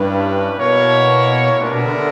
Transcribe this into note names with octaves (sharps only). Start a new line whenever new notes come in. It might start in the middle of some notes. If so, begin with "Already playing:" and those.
Already playing: G2 C#4 E4 G4 B4
B2 A#3 E4 A#4 C#5
A#2 G3 B3 D4 A#4 E5
B2
D3
D3